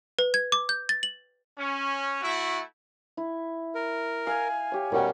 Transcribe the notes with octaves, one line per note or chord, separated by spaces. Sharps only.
B4
G#6
D6
G6
A6
F#7
C#4
A3 E4 F#4
E4
A#4
F5 G#5
G4 C#5
B2 G3 C#4 A#4 C#5 F#5 G5